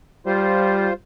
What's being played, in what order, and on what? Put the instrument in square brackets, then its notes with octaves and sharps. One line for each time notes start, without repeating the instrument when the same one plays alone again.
[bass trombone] G3 [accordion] F4 C5